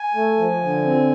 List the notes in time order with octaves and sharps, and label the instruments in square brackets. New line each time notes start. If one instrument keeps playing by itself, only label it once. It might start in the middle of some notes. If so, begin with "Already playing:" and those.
Already playing: [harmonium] G#5
A3
F3
D3
C4